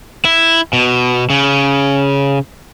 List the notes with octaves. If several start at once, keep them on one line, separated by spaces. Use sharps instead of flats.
E4
B2
C#3